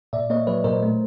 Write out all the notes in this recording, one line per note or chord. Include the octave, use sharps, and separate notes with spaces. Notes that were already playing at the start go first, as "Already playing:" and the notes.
A#2 D5 E5
A#3 C#5 D#5
F#3 B4 C#5
A#2 A#4 C5
A3